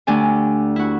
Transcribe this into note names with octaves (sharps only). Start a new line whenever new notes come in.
D2 D4 G4 G#5
E4 F#4